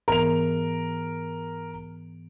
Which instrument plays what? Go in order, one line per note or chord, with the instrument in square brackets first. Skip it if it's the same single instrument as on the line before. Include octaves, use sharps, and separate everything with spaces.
[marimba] G#2 E3 B3 [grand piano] A#4 F7